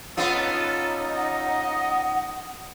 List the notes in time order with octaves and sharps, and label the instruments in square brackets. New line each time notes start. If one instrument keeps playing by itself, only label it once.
[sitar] B3 C#4 F4 [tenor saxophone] D#4 [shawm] A4
[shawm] D#5 [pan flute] F#5